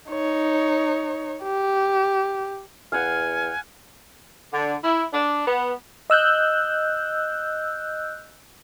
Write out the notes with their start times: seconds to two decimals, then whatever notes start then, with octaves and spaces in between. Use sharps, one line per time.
0.10 D#4 C#5
1.43 G4
2.92 E2 F5 F#5 G#5
4.53 D3
4.83 E4
5.13 D4
5.48 B3
6.10 D#5 E6 F#6 G6